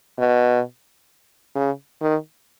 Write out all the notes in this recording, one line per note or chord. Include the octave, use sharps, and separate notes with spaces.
B2
C#3
D#3